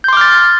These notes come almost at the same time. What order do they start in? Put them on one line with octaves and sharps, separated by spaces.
G6 C6 D6 F6 A6